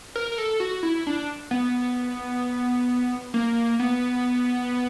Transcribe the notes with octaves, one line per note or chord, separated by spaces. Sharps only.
A#4
A#4
A4
F#4
E4
D4
B3
A#3
B3